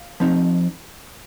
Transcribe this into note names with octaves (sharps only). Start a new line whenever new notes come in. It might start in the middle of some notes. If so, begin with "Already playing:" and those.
Already playing: F5
F3 C4 D#4